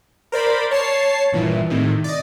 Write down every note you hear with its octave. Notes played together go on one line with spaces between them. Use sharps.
A#4 C5 D5 B5
C#5 A5 C7
G1 A#2 E3
A2 C3 D#3
D5 D#5